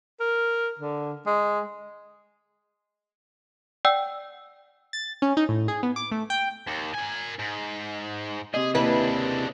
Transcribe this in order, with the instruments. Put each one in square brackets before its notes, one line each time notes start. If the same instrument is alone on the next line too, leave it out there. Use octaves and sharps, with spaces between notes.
[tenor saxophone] A#4
D3
G#3
[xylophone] D5 F#5 G5 E6
[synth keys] A6
C#4
D#4
A2
G#4
B3
D6
A3
G5
[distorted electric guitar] D#2
A#4 G#5
G#2
[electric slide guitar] C3 D#5 [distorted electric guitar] G#4
[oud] D#2 E4 B4 [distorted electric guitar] C#3 D4